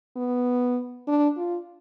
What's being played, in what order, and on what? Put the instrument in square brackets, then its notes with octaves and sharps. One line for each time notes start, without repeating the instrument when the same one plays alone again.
[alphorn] B3
D4
F4